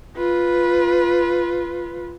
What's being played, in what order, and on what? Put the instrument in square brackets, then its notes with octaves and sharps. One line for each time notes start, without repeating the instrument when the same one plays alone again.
[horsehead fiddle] F4 B4